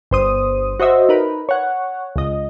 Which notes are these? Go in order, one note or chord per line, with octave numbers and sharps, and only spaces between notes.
G1 C5 D#6
F#4 C5 D#5 E5
D#4 A#4 B4
C#5 F#5
C#2 D#5